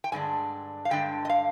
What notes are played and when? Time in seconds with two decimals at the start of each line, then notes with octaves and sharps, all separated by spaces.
0.04 G5
0.12 G2 D3 G#3 D4 G#5
0.85 F5
0.90 G2 D3 G#3 D4 G5
1.25 D#5
1.30 F5